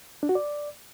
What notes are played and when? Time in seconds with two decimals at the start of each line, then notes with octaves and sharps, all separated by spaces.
0.23 D4
0.29 F#4
0.35 D5